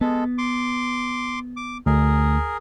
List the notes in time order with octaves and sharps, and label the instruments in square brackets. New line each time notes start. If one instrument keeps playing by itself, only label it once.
[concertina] G#3 A4 [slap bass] B3
[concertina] C6 D6
D6
[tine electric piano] D2 [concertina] G#4 A#4